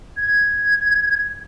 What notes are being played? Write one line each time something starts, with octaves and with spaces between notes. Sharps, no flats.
G#6